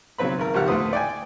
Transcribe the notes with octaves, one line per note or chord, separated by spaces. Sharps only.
B1 C#3 F#3 C4 B4 B5
G#1 A#4
G#1 C#2 F3 G4 F#5 F6
D2 A2 E4 B4 C5 D#6
D5 G5 G#5